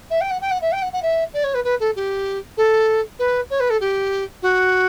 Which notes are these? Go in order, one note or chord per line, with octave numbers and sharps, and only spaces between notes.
E5
G5
F#5
G5
F#5
E5
G5
F#5
F#5
E5
D5
C#5
B4
B4
A4
G4
A4
B4
C#5
B4
A4
G4
F#4